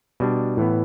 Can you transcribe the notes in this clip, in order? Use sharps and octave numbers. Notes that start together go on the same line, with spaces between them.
B2 G3 D4
A2 E3 B3